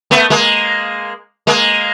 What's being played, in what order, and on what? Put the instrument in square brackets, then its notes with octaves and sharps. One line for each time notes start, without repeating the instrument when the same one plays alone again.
[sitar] A3 B3
G#3 A#3
G#3 A#3